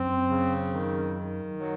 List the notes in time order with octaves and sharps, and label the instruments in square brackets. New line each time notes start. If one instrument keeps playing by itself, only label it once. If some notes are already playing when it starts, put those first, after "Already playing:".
Already playing: [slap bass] F#2 [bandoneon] C4
[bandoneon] C#3
D#3
D#3
F#3